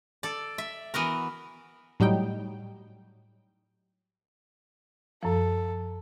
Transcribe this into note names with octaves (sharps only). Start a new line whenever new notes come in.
A4 D5
E5
E3 B3 F#4 A#4
A2 F#3 G3 D#4 G5
F#2 F3 A4